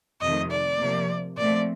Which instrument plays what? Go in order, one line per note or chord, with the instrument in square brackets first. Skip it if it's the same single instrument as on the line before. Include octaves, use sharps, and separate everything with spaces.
[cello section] F2 C3 D#3 A3 [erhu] D#5
[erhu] D5
[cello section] C3 F3 A#3
[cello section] A#2 F3 A3 C4 [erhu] D5